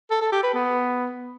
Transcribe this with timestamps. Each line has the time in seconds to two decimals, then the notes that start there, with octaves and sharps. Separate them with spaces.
0.10 A4
0.21 A4
0.32 G4
0.43 B4
0.54 B3